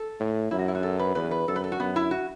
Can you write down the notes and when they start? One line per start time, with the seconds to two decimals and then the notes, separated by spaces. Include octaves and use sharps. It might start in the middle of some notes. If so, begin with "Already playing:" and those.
Already playing: A4
0.20 A2
0.51 F#2 E4
0.59 F#4
0.68 E4
0.75 F#4
0.83 A4
0.99 B4
1.15 E2 B4
1.31 B4
1.48 F#2 A4
1.56 B4
1.64 A4
1.72 F#4
1.80 F#2 B3
1.96 E4
2.11 F#4